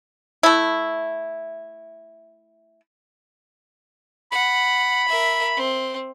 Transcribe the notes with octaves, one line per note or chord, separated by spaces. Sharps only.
A3 E4
F#5 B5
A#4 E5
C4